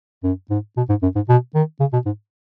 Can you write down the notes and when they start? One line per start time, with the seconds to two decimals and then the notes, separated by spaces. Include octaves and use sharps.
0.24 F#2
0.50 G#2
0.77 B2
0.89 G#2
1.02 F#2
1.15 G#2
1.29 B2
1.55 D#3
1.80 C#3
1.93 B2
2.06 G#2